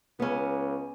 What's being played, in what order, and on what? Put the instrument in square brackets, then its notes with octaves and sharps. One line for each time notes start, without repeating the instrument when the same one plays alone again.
[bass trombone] C#2 [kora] B3 C#4